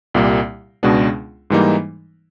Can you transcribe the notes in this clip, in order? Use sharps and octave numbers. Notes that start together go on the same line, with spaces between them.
C2 A#2 G3 A#3
C#2 B2 G#3 B3 D4
G#2 E3 G3 A#3 D#4